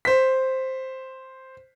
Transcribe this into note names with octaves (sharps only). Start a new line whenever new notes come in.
C5 B6